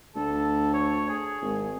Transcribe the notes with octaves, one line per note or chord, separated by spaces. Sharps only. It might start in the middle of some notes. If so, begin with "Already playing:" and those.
D2 A4
C#5
G#4
G#1